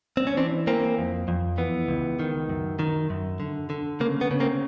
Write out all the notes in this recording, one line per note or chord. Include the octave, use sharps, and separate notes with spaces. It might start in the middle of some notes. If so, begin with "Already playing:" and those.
C4
C#4
E3 C4 D4
E3 A#3 C4
F2
F2
E3 B3
C#2
D#3
F#2
D#3
F#2
D3
D3
C#3 A#3
B3
C#3
A#3 C4